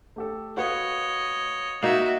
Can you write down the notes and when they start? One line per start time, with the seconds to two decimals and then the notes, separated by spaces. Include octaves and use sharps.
0.16 A3 G4 A4
0.57 F#4 B4 C#5 D#5 F5
1.83 A#3 D#4 F#4 E5 G#6 C7 F7